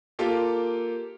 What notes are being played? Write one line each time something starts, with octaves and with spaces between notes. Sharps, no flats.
A#3 F4 G4 A4